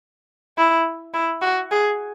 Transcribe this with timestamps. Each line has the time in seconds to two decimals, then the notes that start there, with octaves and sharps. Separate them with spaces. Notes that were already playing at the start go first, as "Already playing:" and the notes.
0.58 E4
1.14 E4
1.42 F#4
1.71 G#4